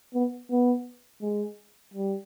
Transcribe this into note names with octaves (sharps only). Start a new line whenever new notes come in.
B3
B3
G#3
G3